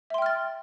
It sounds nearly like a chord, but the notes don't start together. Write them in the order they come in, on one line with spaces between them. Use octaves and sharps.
E5 C6 G5 F6 A6